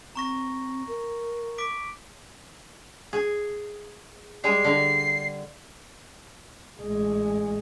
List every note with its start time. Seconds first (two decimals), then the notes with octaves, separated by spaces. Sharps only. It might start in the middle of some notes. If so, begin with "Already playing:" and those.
0.15 C4 A#5 C#6 A#6
0.87 A#4
1.58 D6 B6 D7
3.13 G#4
4.44 G3 G#3 G#4 C7
4.64 D3
6.81 A1 G#3